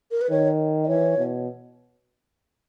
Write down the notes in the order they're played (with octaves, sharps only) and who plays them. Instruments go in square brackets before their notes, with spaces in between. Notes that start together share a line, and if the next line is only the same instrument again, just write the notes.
[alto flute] A#4
B4
[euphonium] D#3 [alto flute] C#5
[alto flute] D#5
[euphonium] E3 [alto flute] C#5
[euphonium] B2